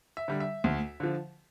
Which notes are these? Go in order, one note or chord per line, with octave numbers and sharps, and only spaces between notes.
E5
D3 G3
E5
D2
D3 F3